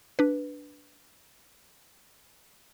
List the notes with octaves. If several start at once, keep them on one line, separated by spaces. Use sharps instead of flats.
D4 B4